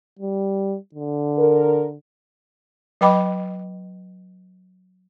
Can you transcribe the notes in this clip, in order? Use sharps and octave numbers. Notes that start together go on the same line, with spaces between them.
G3
D3
A#4
F#3 B4 D#5 G5 B5 D6